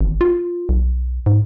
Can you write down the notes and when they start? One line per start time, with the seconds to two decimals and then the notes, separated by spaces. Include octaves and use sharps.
0.01 G#1
0.21 F4
0.69 B1
1.26 G#2